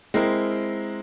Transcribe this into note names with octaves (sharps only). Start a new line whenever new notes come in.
G#3 C4 E4 A#4